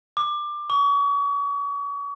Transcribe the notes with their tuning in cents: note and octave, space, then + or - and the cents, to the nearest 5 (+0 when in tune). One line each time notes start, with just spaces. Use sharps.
D6 +20
C#6 +35